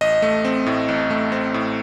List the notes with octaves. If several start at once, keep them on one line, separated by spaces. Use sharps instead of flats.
A1 D#5
A3
C4
A2
A1
A3
C4
A2